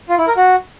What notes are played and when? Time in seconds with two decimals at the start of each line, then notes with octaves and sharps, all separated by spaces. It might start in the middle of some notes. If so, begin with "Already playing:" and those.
0.09 F4
0.18 E4
0.28 A#4
0.37 F#4